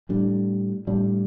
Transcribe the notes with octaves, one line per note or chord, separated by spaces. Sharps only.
A2 G3 D4
A2 G3 D4